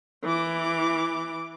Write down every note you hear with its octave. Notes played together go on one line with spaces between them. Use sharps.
E3 D6